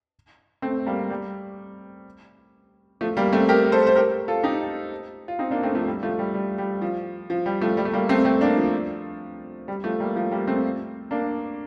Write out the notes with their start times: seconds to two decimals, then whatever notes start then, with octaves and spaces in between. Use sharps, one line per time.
0.62 A3 C4
0.86 G3 A#3
1.10 G3
3.01 F3 A3
3.17 G3 A#3
3.32 A3 C4
3.49 G4 A#4
3.72 A4 C5
3.87 C5
3.96 G4 A#4
4.28 F4 A4
4.43 D#4 G4
5.28 F4
5.39 C4 D#4
5.51 A#3 D4
5.63 A3 C4
5.75 F3 A3
5.87 G3
6.03 F3 A3
6.19 G3
6.34 G3
6.58 G3
6.81 F3
7.30 F3
7.46 G3
7.61 F3 A3
7.77 G3
7.85 A3
7.93 G3 A#3
8.09 A3 C4
8.25 A3 C4
8.41 A#3 D4
8.57 F3
9.68 G3
9.84 F3 A3
10.00 G3 A#3
10.16 F3 A3
10.31 G3 A#3
10.47 A3 C4
11.11 A#3 D4